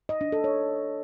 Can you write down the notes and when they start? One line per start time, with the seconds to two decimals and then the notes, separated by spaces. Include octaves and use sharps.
0.09 D#5
0.21 D4
0.32 A4
0.44 C#5